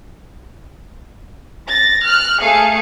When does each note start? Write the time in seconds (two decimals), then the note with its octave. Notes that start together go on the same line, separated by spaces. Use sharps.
1.68 A6 A#6
2.06 F6 F#6
2.42 A3 G#4 F5 C#7